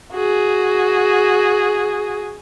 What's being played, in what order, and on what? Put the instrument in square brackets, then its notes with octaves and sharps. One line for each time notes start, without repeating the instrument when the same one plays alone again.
[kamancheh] F#4 G#4